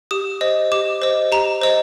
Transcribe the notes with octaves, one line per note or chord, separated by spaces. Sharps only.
G4 D#6
C5 D#5
G4 D6
C5 D#5
G4 A#5
C5 D#5